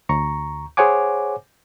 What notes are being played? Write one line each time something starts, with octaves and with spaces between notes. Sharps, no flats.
D2 A#5 C#6
G#4 C5 C#5 F#5 G#5 D6